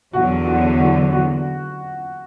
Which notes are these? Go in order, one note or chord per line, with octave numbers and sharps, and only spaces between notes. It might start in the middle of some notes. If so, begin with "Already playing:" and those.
E2 D3 F#3 F#4
F#4
F#4
F#4